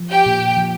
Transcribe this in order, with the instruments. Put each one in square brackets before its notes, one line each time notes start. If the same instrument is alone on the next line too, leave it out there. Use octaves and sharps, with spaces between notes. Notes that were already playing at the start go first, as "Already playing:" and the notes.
Already playing: [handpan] F3
[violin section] G4 G5
[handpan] A#2
F3